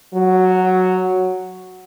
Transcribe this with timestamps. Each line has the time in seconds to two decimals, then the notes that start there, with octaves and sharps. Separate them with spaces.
0.14 F#3